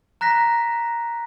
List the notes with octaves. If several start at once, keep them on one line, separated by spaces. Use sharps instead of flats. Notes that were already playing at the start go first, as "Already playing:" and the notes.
A#5 F#6 A#6 B6